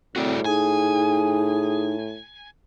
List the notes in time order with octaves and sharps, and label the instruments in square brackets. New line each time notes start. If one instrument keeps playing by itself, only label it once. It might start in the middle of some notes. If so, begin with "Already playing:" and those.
[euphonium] A2 [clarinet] C4 [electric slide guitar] F#4 G#4 D5
[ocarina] D#4 [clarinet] G#4 [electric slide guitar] G#5